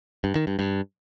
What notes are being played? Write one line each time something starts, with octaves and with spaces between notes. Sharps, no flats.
G2
D#3
G2
G2